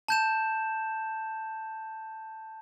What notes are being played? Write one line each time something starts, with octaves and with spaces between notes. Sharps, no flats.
A5 G6 E7